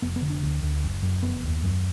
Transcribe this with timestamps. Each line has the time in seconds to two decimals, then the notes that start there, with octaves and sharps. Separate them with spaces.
0.02 F1 B3
0.16 B3
0.22 D3
0.30 D4
0.43 D2
0.63 D2
0.84 F#1
1.03 F#2
1.23 F1 B3
1.44 D#2
1.63 F#2